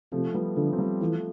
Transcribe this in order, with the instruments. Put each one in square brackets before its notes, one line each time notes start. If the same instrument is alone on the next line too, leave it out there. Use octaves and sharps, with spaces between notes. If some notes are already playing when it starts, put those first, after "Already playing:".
[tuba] C3 [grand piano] F3 A3
[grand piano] G3 B3
[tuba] D3 [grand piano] F3 A3
[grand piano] C4
G3 B3
[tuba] E3 [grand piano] F3 A3